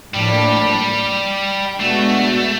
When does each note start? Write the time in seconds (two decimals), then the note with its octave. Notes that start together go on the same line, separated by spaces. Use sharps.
0.14 A2 F3 G3 A#3 D4
1.79 B2 G#3 A3 B3 D4 F#4